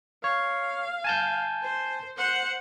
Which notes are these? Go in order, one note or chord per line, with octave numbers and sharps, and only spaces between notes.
C#5 F5
G#5 A5 G6
C5
C5 F#5